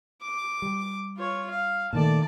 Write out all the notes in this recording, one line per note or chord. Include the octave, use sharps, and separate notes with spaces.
D6
G3
F4 C#5
F5
A#2 D#3 A3 D5 A5